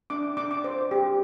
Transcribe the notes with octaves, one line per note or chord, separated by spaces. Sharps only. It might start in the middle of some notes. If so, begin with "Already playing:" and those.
D4 D6
D4 D6
D6
C5
G4